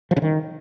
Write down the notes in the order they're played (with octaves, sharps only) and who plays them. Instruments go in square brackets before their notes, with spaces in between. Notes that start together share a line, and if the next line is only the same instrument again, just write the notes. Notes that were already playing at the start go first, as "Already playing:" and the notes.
[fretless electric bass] F3
C#3
D#3